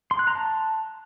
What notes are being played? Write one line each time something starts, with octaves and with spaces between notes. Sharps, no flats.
C6
F#6
A#5
A5